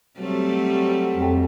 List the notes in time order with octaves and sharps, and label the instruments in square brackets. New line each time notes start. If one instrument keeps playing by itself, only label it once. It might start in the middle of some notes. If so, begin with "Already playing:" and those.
[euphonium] F#3 [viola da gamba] G3 A3 C4
[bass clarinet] F2